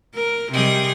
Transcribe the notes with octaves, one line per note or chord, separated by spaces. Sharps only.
A#4
C3 G3 G#4 D#5